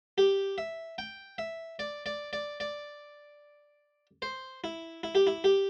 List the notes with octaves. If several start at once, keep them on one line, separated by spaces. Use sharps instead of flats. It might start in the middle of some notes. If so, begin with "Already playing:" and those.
G4
E5
G5
E5
D5
D5
D5
D5
C5
E4
E4
G4
E4
G4